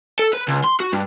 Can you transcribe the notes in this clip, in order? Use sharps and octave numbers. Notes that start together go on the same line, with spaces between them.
A4
B4
C#2
C6
F#4
G2